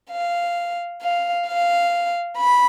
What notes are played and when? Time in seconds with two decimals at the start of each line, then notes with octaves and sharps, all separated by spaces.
0.11 F5
1.02 F5
1.47 F5
2.38 B5